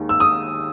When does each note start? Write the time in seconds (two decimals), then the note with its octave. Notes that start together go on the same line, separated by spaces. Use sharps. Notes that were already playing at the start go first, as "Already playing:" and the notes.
Already playing: D#2 D#3 G#3
0.09 E6
0.20 D#6